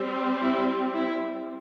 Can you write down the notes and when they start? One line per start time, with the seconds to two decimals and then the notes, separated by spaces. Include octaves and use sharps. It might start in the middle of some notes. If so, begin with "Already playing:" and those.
Already playing: G3 C4
0.41 E4
0.94 E4